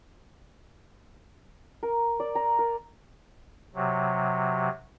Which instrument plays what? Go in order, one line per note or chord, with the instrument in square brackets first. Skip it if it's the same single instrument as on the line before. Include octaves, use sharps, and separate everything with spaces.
[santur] A#4
D5
A#5
A#4
[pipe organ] C3 F#3